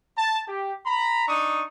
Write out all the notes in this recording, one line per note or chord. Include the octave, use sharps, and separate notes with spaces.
A5
G4
A#5 B5
D4 D#4 C#6 D#6